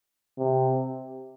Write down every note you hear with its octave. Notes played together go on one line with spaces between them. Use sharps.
C3